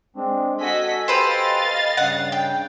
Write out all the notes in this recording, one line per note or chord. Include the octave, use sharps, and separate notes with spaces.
G#3 C4 D4
F#4 A4 D#5 G#5 B6
G4 B4 C5 D#5 F5 A6
G2 C#3 F#5
G5